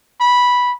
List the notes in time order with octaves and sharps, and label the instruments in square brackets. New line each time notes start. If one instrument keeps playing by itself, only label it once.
[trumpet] B5